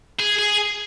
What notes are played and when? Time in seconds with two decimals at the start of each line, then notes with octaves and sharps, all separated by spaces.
0.20 G#4
0.39 G#4